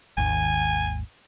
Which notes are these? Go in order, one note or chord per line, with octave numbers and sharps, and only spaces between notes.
G#1 D#2 G#5